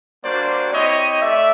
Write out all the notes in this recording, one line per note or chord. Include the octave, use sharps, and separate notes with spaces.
G3 A#3 D4 F#4 C5 D5
C4 E4 G4 C#5 D#5
A3 D5 E5